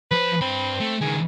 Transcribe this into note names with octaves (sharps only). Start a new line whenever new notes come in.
F3 B4 C5
G2 C4 B5
A3
C#2 D#3 G#4